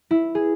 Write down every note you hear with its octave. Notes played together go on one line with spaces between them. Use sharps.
E4
G#4